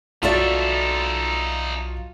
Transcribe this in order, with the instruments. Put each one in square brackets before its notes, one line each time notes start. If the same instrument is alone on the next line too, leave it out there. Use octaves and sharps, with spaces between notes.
[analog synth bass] B1 [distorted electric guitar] D#4 A4 [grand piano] F4 F#4 [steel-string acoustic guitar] D5 E5 A5